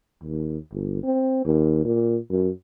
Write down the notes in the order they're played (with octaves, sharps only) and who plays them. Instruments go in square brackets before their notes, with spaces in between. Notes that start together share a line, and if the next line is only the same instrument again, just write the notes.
[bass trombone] D#2
G1
C4
D#2
A#2
F#2